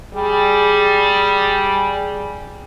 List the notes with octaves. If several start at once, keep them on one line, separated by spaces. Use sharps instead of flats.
G3 G#4